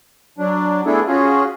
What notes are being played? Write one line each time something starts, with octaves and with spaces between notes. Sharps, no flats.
F#3 D4
A3 B3 D4 E4 G#4 A4
C#4 F4 F#4 G#4